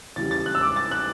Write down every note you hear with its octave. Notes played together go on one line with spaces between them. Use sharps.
E2 C#3 E3 G3 A6
A6
F#6
E6
D6
A6
F#6